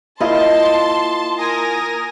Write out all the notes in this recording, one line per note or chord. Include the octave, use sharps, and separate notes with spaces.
A#3 E4 F4 D#5 A5 C6
A#4 G#5 D#6 A#6